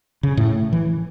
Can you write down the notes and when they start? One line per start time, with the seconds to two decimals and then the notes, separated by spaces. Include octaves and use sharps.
0.23 C#3
0.37 A2
0.73 E3